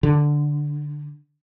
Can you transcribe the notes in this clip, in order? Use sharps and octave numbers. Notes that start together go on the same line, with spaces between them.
D3